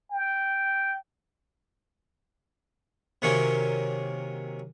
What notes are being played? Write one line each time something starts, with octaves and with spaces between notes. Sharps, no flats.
G5
C3 D#3 F#3 A#3 C#4